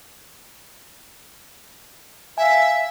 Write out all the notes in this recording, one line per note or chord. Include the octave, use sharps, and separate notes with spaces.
E5 F5 G#5